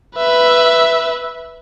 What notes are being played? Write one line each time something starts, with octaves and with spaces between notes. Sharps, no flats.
B4 E5